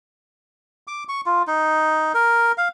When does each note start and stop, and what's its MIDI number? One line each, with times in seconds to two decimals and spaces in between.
0.87 1.04 86
1.09 1.21 85
1.26 1.43 65
1.47 2.12 63
2.14 2.52 70
2.58 2.68 77